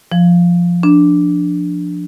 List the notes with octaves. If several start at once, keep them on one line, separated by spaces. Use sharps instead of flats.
F3
D4